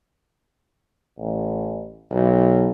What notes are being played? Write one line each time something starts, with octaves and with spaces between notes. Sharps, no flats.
A1
B1